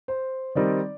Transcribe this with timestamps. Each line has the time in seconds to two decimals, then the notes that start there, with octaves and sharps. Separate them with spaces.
0.08 C5
0.55 D#3 G3 C4 D#4 D5